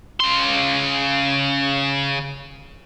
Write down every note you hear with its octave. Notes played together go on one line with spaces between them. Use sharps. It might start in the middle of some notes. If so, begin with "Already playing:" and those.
C#3 C6